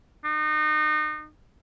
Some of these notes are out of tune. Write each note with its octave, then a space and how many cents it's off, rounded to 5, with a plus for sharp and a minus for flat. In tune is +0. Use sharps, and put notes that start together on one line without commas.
D#4 -30